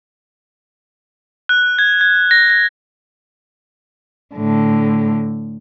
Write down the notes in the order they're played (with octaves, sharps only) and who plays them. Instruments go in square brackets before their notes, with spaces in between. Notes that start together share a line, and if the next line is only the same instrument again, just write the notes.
[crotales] F#6
G#6
G#6
A#6
A#6
[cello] A2 D3